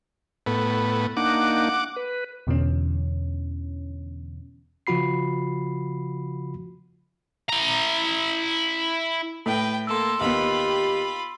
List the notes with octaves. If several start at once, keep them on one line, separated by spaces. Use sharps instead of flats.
A2 B3
A#3 D4 D#4 F#5 D6
B4
E2 B2 D3 E3 C#4
C#3 F3 F4 F#4 B5 C7
E4 A#5
A2 B4 G5
A#3 A4 C6 E6
D#2 B3 F4 G4 B5